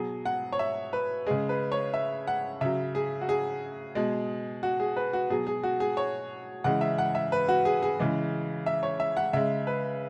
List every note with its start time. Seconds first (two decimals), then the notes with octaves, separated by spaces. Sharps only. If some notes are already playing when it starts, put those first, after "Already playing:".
Already playing: B2 F#3 G#4
0.26 F#5
0.52 C#5
0.59 E5
0.93 B4
1.26 C#3 G#3 G#4
1.49 B4
1.72 C#5
1.94 E5
2.27 F#5
2.61 C#3 F#3 E5
2.95 G#4
3.21 F#4
3.29 G#4
3.95 B2 G#3
4.63 F#4
4.80 G#4
4.97 B4
5.13 F#4
5.30 B2 F#3 G#4
5.47 G#4
5.63 F#4
5.80 G#4
5.97 C#5
6.64 C#3 E3 G#3 F#5
6.81 E5
6.98 F#5
7.15 E5
7.32 B4
7.48 F#4
7.65 G#4
7.82 G#4
7.99 C#3 E3 G#3
8.66 E5
8.83 C#5
9.00 E5
9.17 F#5
9.33 C#3 G#3 E5
9.67 B4